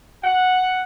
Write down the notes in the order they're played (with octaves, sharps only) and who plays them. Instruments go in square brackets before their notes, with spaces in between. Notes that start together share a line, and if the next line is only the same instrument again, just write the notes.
[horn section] F#5